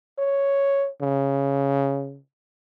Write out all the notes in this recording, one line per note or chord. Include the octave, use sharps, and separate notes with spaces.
C#5
C#3